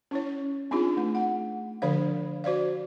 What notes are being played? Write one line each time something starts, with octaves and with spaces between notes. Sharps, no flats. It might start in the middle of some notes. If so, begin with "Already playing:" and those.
C#4 E4 C#5
C4 D4 D#4 F4 G#4
A3
F#5
D3 F3 D4 C5 F5
F#4 C5 D5 F5